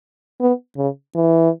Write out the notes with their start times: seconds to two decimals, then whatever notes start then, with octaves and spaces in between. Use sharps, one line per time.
0.40 B3
0.77 C#3
1.15 E3